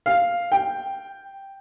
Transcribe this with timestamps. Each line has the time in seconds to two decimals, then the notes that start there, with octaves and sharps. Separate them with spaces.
0.06 F5
0.52 G5